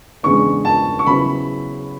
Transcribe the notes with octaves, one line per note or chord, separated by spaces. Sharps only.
E2 C#3 G#3 B3 D4 C#6
A5
C#6
C#3 F#3 B3 E4 B5